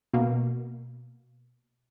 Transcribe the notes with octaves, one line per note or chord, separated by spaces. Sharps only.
B2 A#3